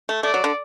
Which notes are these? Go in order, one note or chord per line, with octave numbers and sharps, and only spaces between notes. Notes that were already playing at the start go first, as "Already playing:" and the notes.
A3
A3 D5
F#3
D3